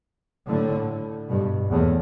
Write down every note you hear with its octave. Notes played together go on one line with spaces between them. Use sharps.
A2 D3
G2 B2
E2 A2